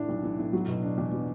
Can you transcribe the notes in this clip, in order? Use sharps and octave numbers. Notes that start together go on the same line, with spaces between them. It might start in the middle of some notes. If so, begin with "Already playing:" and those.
Already playing: A2 E3 D4
B1
E3
A2
F#3
B2
D4
E2
F#3